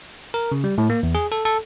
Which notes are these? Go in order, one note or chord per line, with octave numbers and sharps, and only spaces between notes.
A#4
C#3
G3
A2
A#3
E2
G#4
A4
A4